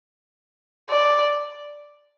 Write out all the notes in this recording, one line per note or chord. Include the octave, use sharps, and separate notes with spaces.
D5